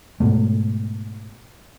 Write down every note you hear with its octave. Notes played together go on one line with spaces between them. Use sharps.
G#2 B2 A3